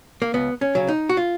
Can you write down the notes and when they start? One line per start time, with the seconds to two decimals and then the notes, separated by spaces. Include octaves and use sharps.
0.22 A#3
0.34 C#2 B3
0.61 C#4
0.75 C#3 F#3
0.88 D#4
1.09 F#4
1.17 F4